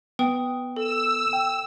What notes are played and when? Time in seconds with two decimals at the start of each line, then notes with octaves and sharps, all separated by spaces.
0.19 B3 B4 G5 D#6
0.76 A4 E6
1.33 G5